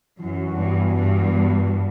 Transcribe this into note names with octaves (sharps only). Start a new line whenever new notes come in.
F#2 E3
F#4
G2 B3
E3
G2 F#4
B3
B3
E3
B3